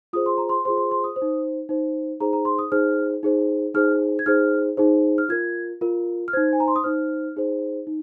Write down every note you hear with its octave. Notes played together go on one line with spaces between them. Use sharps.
F4 G#4 C5 D#6
C6
A#5
C6
F4 G#4 C5 C6
C6
C6
D#6
C5
D#4
D#4 C5
D#4 G#4 C5 A#5
A#5
C6
D#6
D#4 G#4 C5 F6
D#4 G#4 C5
D#4 G#4 C5 F6
G#6
D#4 G#4 C5 F6
D#4 G#4 C5
F6
F4 A#4 G#6
F4 A#4
F6
D#4 C5 G#6
G#5
A#5
C6
D#6
D#4 C5 F6
D#4 G#4 C5
D#4